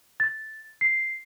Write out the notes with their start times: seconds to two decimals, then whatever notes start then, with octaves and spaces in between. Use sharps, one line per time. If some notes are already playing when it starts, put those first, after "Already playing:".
0.20 A6
0.81 C7